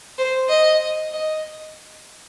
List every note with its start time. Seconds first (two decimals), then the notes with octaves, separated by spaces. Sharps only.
0.18 C5
0.49 D#5
1.12 D#5